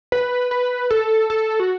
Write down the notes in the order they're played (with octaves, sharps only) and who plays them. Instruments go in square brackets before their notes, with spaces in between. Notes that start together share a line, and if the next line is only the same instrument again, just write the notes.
[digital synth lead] B4
B4
A4
A4
F#4